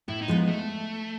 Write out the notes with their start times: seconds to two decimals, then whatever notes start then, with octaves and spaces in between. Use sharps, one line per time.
0.08 A2 E4
0.22 D#4
0.28 F3 G#3 B3
0.48 A3